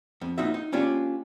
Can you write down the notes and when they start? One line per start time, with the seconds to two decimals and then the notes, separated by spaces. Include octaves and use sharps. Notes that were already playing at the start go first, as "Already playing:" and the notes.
0.21 F2
0.38 A#3 D#4 F4 F#4 E5
0.54 D#4
0.72 A#3 C#4 D4 F4 G4